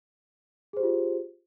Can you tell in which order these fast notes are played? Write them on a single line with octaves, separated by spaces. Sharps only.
G#4 C5 G4 F4